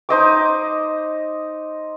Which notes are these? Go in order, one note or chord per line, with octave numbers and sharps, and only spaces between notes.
D#4 C5 D#5 D6